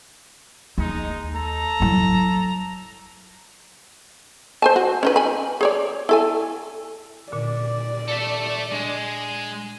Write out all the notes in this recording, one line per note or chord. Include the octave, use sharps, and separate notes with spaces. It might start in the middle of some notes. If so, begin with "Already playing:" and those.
D#2 G#3 D#4
A4 A#5
F#3 E4
C5 G#5 A5
F#4
C#4 D#4 B4
G#5 B5
G#4 C#5 D5
E4 A4 G#5
A#2 D3 D5
A4 E5
G#3 D4